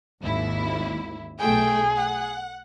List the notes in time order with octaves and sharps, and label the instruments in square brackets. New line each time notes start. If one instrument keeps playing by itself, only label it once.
[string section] G#1 D#2 E4
[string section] B1 A3 G5 [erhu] G#4
[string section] F#5